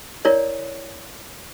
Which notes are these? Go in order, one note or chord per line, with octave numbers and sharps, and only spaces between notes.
E4 A#4 C#5 D5